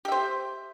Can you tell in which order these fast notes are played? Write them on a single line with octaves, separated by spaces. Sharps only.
G4 E5 C5